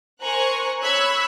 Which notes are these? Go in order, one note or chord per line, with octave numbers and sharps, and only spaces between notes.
A#4 C5 G#5 A#5 C#6 F#6
C#5 B5 C#6 E6 F#6 G#6